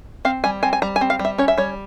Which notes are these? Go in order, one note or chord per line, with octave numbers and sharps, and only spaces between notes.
C4 F5
G3 G#5
C4 G#5
G#5
G3 A#5
G#5
C4
F5
G3
E5
C#4 C#5
E5
G3 C#5